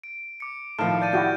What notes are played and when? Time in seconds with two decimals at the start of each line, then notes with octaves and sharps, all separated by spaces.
0.04 D7
0.40 D6 C#7
0.79 A2 D#3 F3 F5 A5 F6
1.02 D5 G6 A6 D#7
1.13 E4 F#4 G4 G6